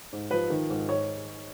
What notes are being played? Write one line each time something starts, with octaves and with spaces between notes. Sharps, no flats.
G#2
F3 B4
D#3
G#2
G#2 C#5